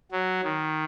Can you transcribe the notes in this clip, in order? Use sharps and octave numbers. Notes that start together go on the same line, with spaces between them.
F#3
D#3